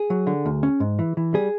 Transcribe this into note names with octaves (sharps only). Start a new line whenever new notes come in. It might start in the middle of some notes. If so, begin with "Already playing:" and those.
Already playing: G#4
F#3
D3
D2
C#4
G#2
E3
E3
G3 G#4